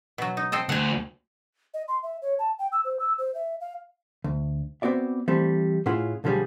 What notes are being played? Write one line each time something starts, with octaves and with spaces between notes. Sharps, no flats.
B2 F#3
D#4
C4 A4 D#5
D2 F#5 G#5
D#5
C6
E5
C#5
A5
G5
E6
C5
E6
C5
E5
F5
D2
B3 C4 F#4 D5 E5
E3 G3 A3 C4
A2 C#4 E4 F4 G#4 F#5
B1 D3 F3 G3 G#4 D5